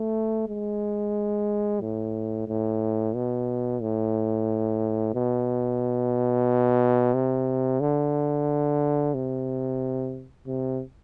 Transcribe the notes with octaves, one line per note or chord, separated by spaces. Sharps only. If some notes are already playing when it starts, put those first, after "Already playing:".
Already playing: A3
G#3
A2
A2
B2
A2
B2
C3
D3
C3
C3